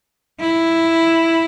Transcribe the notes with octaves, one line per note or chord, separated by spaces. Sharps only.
E4